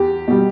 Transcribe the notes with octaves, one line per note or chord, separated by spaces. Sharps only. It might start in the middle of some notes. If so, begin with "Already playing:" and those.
Already playing: E2 G4
B2 G3